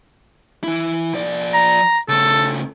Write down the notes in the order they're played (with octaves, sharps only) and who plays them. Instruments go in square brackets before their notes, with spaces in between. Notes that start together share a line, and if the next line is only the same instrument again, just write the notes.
[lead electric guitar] E3 E4
F3 D5
[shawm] A#5
[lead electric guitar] C#3 A3 [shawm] A4